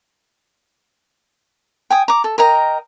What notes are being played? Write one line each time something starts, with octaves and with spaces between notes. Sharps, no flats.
G5 G#5 D#6
A#5 D6
A4
A#4 D#5 G5 A#5